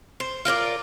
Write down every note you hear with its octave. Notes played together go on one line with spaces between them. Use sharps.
C5
F4 A#4 C5 D5